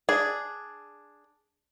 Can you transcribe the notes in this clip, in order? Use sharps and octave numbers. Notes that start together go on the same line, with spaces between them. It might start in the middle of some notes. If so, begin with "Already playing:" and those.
D4 G#4